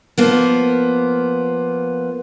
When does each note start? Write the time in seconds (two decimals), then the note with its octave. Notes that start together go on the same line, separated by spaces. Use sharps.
0.18 F3 A#3 B3